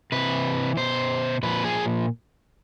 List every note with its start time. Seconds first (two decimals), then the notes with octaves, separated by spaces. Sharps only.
0.12 C3 E3 B4
0.77 B2 C5
1.43 A#2 F3 B4
1.64 G#4